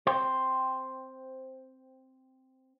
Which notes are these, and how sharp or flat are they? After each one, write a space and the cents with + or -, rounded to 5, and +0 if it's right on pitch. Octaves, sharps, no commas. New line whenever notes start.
C4 +0 C5 +0